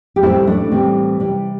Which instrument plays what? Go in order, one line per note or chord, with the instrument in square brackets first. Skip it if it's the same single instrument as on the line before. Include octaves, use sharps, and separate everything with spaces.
[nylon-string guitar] G4
A2 E3 G3 C4 E4
A3 D4
A2 E3 G3 C4
C3 G3